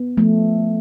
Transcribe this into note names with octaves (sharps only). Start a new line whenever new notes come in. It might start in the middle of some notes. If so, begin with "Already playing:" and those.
Already playing: B3
F3 A3